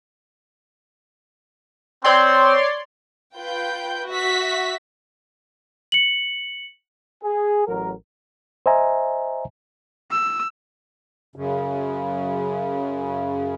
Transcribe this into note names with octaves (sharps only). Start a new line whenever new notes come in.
C4 C#5 D5 C6
F4 B4 G5 G6
F#4 E5 B6
C#7 F#7
G#4
A1 F#3 A#4
C5 D#5 E5 G#5 A#5
E6
F#2 C#3